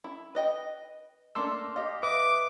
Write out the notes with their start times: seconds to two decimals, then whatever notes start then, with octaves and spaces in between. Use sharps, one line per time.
0.04 E4
0.35 B4 D#5 G5
1.35 A3 A#3 D4 C6 E6
1.76 G4 D#5 F5
2.03 B4 E5 D6 D#6